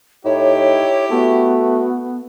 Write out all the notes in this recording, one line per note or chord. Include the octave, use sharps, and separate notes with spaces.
A2 D#4 E4 G4 C#5
A3 B3 F#4